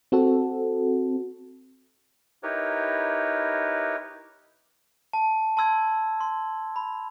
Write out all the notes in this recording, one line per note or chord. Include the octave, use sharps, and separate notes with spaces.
C4 F#4 A4
D#4 E4 G4 A#4 B4 C#5
A5
A5 C6 E6 G#6
C6
B5